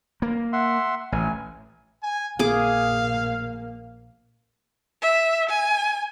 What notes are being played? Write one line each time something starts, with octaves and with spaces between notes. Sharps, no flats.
A#3
E5 F#5 C6
A1 G#5
G#5
A#1 A#3 G#4 F5 D6
E5
G#5